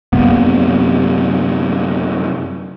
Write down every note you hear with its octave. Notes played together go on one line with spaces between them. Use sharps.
F#2 C3 A#3 B3